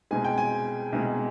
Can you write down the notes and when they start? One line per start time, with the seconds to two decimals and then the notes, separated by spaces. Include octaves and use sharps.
0.11 C2 B2 G#3 G#5
0.24 G5
0.38 G#5
0.93 C2 B2 G#3